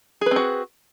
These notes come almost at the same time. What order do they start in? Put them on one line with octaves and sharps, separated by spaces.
G#4 B4 C4 F#4